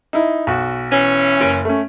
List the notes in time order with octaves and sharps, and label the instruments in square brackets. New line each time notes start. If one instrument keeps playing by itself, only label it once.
[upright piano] D#4 E4
B1 F#4
[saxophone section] E3 C#4
[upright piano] F#1 D7
A3 C#4